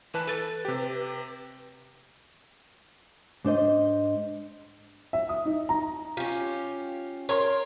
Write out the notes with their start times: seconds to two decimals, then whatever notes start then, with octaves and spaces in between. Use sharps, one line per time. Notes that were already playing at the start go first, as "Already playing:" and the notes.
0.14 E3 B4 A5 F#6
0.27 A4 B4 A6
0.65 C3 G4
3.45 G#2 D4 C5 D#5
5.13 E5
5.29 D#6
5.45 D#4
5.69 A#5
6.17 C#4 F4 G4
7.29 A#4 C#5 C6